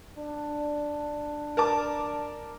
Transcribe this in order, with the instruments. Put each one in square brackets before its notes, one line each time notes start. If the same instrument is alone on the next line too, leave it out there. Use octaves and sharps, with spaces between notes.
[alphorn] D4
[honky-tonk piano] A#4 A5 D6